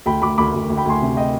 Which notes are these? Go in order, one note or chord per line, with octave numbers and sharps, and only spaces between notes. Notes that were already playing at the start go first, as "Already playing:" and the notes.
D2 G5 B5
D2 B5 D6
D2 B5 D6
D2
D2
G5 B5
D2 G#5 C6
C3
D#5 G5